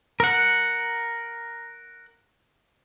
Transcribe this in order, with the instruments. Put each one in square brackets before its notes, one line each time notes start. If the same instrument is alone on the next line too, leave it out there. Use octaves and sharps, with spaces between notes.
[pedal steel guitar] A#4 F#5